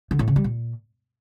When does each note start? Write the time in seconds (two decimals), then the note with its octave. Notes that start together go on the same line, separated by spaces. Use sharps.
0.11 D3
0.19 A2
0.28 C#3
0.36 G3
0.44 A#2